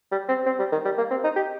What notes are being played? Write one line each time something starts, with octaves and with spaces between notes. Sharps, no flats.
G3
C4
C4
G3
D#3
G3
A#3
C4
D#4
G4